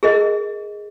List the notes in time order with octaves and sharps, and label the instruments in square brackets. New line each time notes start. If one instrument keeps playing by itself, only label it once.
[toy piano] G#4 A#4 D#5